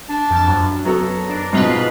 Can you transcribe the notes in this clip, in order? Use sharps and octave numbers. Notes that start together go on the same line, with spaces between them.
D4
F2 A5
F#2
F#3 B3 A4 A#5
D4
G#2 B2 F4 B4